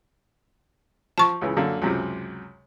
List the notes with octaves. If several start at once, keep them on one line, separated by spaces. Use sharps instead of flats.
F3 A5 C#6
C#2 C#3 E3
F#2 D3 A#3
C#2 F#2 C3